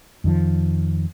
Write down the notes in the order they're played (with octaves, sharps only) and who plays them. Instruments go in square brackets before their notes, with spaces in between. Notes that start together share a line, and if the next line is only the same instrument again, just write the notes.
[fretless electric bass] F2 D#3 F3